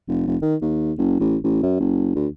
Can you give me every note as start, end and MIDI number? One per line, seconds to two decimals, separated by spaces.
0.08 0.25 29
0.27 0.36 29
0.42 0.55 51
0.62 0.93 39
0.98 1.18 30
1.20 1.36 33
1.44 1.59 33
1.63 1.78 42
1.80 2.14 30
2.15 2.27 38